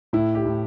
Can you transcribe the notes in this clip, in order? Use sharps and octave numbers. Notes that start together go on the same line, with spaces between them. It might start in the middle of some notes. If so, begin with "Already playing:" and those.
A2 E4
G4
A2